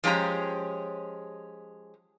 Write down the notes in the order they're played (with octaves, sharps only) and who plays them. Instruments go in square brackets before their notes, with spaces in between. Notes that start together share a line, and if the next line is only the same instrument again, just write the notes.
[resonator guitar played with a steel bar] F3 G#3 C#4 G4 A#5